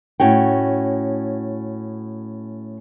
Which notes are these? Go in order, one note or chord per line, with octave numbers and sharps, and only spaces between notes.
A2 C#4 F#4 G5